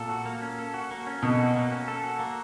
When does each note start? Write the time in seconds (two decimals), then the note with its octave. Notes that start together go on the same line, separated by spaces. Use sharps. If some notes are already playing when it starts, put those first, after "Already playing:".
Already playing: A#2 A4
0.09 F#4
0.25 A#3
0.42 C#4
0.59 A4
0.74 F#4
0.91 A#3
1.07 C#4
1.23 B2 A4
1.39 F#4
1.55 A#3
1.72 C#4
1.88 A4
2.04 F#4
2.19 A#3